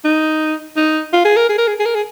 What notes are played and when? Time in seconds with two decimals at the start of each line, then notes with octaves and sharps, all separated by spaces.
0.04 D#4
0.77 D#4
1.13 F4
1.25 G#4
1.36 A#4
1.49 G#4
1.58 A#4
1.67 G#4
1.79 G#4
1.85 A#4
1.95 G#4